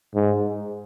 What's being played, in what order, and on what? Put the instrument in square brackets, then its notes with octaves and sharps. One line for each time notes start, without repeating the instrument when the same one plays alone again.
[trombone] G#2